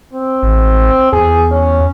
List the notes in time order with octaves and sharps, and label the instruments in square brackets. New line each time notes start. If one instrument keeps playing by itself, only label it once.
[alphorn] C4
[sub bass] A1
[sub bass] E2 [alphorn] G#4
[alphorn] C#4